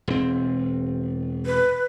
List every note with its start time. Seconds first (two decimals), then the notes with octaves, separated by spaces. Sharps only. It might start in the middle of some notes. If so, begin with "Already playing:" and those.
0.08 E1 C4
1.46 B4